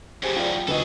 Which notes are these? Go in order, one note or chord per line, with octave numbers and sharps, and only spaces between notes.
F#2 A2 G4 G#4 C5 G#5
F4 D5 G5
D2 F#4 G#4 A4 B4 D#5